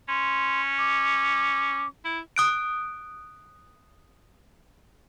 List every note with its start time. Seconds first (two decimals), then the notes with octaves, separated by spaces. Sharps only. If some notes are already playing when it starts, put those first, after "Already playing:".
0.08 C#4 C6
0.78 D6
2.05 E4
2.36 D#6 F#6 D7